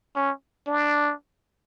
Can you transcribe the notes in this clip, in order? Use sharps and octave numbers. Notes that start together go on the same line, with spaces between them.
C#4
D4